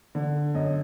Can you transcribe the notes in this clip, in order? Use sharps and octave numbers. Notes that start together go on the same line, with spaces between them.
D3
F#2 D#5